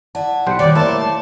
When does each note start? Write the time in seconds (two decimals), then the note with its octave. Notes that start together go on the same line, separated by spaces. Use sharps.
0.15 E4 D5 F#5 A5
0.47 B1 G3 C5 F#6 C#7
0.59 D#3 A#3 C#5 D5 D6
0.75 A3 A#3 E4 C5 A5